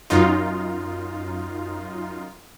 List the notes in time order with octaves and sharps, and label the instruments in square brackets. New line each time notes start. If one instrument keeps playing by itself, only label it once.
[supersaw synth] F#2 D#4 F4